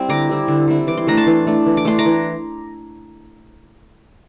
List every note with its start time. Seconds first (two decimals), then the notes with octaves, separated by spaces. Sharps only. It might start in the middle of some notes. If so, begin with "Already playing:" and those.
Already playing: G3 C4 E4 G5
0.09 D3 A#5 D6
0.29 G3 C4 E4
0.48 D3
0.68 G3 C4 E4
0.87 E3 D6
0.97 C6
1.07 A3 D4 A#5
1.17 A5 C6
1.27 E3
1.47 A3 D4
1.66 E3
1.77 D6
1.85 A3 D4 C6
1.99 A#5 D6
2.05 E3